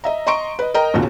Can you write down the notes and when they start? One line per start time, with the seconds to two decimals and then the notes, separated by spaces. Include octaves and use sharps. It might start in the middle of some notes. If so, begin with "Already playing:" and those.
0.04 D#5 E5 A#5
0.27 D#5 A#5 C6 C#6 D7
0.59 B4 D#5
0.74 A#4 D#5 G5 A#5
0.94 E1 D#2 A#2 C#3 F#4